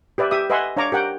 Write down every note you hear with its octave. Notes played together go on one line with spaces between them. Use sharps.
G4 B4 D5 E5
G4 E5 D#6
B4 D#5 E5 F#5 G#5 C6
D4 C#5 F5 A#5 C#6 D6
G4 A#4 F#5 G5